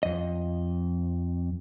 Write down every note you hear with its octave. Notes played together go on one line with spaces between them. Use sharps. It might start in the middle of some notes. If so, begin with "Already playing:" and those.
F2 D#5